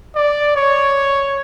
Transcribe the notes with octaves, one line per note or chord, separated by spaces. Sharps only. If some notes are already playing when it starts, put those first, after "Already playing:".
D5
C#5